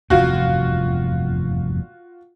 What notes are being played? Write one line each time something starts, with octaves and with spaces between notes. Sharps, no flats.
F1 E2 G2 F4 F#4